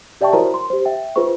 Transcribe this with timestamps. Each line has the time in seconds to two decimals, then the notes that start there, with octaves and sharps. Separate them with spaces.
0.21 G4 D5 E5 G5 A5 C#6
0.33 E4 F#4 A#4 C5 C#5 A#5
0.54 C6
0.70 G4 C5
0.85 E5 G5
1.16 F4 G#4 B4 C5 C#6